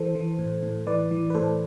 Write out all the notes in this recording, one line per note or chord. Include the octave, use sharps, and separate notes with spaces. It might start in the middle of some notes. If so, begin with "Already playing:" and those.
Already playing: E3 A4 C5
E3
A2
A2
E3 B4 D5
E3
B4
A2 A4 C5